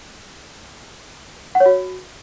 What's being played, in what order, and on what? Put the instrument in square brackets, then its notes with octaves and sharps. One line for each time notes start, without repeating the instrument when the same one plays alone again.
[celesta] F#5
C#5
F#4